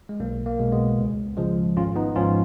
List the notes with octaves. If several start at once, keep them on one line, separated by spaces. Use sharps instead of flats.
G#3
B1 A#3
A#3
B2 G#3
G#3 B3
C#2
C#3 F3 G#3
G#1 C#4 F4
B3 D#4
G#2 F3 C#4 F4